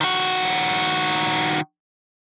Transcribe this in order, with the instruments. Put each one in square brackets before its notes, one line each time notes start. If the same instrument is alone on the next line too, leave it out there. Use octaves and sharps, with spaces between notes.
[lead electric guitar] D#3 F#4